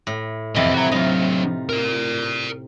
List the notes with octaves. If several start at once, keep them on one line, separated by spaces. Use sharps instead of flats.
A2
F2 C3 E3 F3 D#5
F#4 A#5
D3 F#3 D#4 F4
A#4 D5